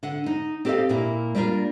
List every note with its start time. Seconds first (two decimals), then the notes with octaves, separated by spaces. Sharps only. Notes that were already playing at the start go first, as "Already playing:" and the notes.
0.03 D3 F#5
0.26 D#4
0.65 C4 G4 A4 B4 D#5 F5
0.89 A#2 A#3 E4
1.35 G3 A#3 D4 F4 A#4